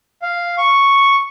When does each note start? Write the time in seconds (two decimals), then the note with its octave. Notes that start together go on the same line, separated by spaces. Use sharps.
0.22 F5
0.58 C#6